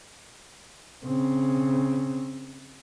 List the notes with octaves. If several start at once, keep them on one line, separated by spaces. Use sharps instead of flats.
C#3 C4